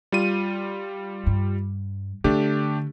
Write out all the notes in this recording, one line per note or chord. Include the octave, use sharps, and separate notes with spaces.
G3 F4 D#7
G2
D3 A3 D4 G4